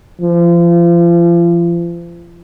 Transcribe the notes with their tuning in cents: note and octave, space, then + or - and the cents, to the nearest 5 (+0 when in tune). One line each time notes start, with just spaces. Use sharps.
F3 -35